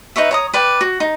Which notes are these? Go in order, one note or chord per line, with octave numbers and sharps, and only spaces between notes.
D#4 B4 C#5 E5
C#5 A#5 D#6
B4 D5 G5
F#4
D#4